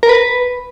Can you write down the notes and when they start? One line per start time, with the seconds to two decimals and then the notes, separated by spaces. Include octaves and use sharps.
0.03 A#4
0.09 B4